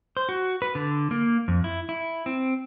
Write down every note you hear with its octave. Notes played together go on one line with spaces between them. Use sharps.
C5
F#4
B4
D3
A#3
F2
E4
E4
C4